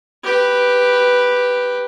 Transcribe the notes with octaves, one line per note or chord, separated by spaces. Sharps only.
G4 B4